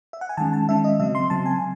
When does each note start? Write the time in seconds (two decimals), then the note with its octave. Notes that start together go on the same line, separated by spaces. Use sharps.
0.13 E5
0.21 F#5
0.29 G#5
0.37 D#3 G#3 C#4 A5
0.53 A5
0.69 D#3 G#3 C#4 E5
0.84 D#5
1.00 C#3 F#3 C4 E5
1.15 C6
1.30 C#3 F#3 C4 A5
1.46 G#5